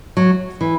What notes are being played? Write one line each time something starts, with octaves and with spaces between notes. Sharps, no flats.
F#3
E3